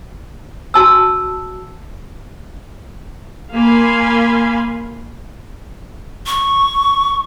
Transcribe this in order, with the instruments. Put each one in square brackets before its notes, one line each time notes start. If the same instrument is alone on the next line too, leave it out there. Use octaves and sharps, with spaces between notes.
[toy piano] F#4 A5 E6
[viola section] A#3 F5 G#5 B5 C6
[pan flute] C#6